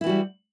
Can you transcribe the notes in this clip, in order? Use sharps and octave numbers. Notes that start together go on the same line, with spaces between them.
E3 G3 E4 F#4